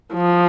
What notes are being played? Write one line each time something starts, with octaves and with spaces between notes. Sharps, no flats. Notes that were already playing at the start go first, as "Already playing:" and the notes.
F3